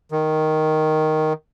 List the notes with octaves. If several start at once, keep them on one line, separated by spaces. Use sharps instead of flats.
D#3